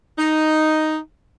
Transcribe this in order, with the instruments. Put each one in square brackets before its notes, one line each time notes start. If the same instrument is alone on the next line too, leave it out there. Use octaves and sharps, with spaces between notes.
[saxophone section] D#4